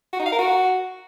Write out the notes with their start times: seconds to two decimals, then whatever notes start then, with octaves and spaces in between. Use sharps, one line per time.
0.13 F#4
0.20 D#4
0.26 F5
0.32 A#4
0.39 F#4